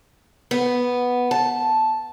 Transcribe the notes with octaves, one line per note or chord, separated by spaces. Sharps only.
B3
A5